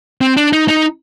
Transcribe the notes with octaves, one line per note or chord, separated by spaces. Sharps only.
C4
D4
D#4
D#4